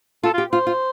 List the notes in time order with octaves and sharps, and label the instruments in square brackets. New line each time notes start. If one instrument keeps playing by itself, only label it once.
[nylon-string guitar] F4 [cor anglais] A4
[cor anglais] F4 [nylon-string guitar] G4
[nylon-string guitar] F4 [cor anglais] C5
[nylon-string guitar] F4